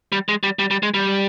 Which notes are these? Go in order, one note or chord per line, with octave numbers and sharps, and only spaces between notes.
G3
G#3
G3
G3
G3
G#3
G3